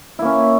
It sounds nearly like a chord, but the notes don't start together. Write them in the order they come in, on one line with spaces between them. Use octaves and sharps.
E4 A#3 C#4